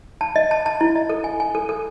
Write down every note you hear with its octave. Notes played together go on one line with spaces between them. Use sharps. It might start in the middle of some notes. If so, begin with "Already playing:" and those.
A5
D#5
A5
A5
E4
D#5
A4
G#5
G#5
A4
A4